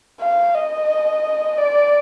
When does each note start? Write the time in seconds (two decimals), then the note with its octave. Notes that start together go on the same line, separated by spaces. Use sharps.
0.21 F5
0.55 D#5
1.58 D5